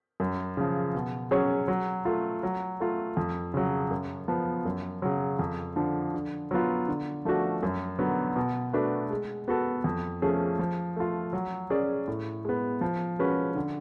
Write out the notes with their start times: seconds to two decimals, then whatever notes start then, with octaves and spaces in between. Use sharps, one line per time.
0.20 F#2
0.57 C#3 F3
0.95 B2
1.31 F#3 C#4 G#4 C#5
1.68 F#3
2.05 A3 F4
2.43 F#3
2.80 A3 F4
3.17 F2
3.54 C#3 F#3
3.91 F#2
4.28 F3 B3
4.65 F#2
5.02 C#3 F#3
5.39 F2
5.76 D3 F3
6.14 D3
6.51 F#3 B3 F4
6.88 D3
7.25 F3 A3 D4 F#4
7.63 F#2
7.99 D3 F#3 B3
8.36 B2
8.73 A3 D4 F#4 B4
9.11 G#3
9.48 B3 F#4 A4
9.84 F2
10.22 F3 A3 C#4 G#4
10.59 F3
10.96 A3 F4
11.33 F#3
11.70 C#4 G#4 D5
12.08 A2
12.45 G#3 B3
12.81 F3
13.19 G#3 C#4 F#4 B4
13.55 D3